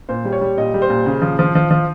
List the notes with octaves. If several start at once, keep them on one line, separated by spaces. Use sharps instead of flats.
A#2 C5
G3
C#5
G3
A#2 D#5
G3
C5
A#2
C#3
F3
F3
F3
F3